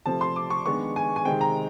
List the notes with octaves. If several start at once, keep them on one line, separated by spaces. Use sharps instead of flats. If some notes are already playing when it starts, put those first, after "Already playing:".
C3 F3 A3 C4 A5
C6
D6
C#6
D#3 G#3 B3 D4 C#6
G#5
G#5
C3 D#3 G#3 C4 G5
A#5